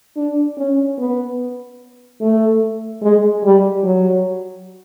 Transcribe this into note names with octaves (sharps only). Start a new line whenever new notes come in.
D4
C#4
B3
A3
G#3
G3
F#3